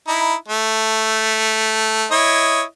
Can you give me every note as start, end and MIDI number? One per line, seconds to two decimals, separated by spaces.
0.08 0.34 63
0.08 0.34 64
0.48 2.06 57
2.11 2.62 64
2.11 2.62 73
2.11 2.62 75